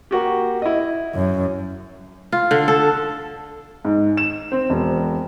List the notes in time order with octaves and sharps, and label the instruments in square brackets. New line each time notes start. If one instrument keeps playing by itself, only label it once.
[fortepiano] A#3 F#4 G4
E4 D#5
[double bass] F#2
[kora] F4
D3
A4
[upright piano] G#2
E7
C4
E1